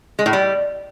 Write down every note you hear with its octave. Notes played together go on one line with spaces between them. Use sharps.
G#3
A2
G3